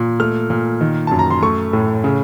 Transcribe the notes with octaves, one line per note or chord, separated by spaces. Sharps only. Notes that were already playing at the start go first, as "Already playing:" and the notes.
Already playing: A#2
A3 F6
A#2
D#3
F#2 A5
A#5
C6
A3 C#6
A2
C#3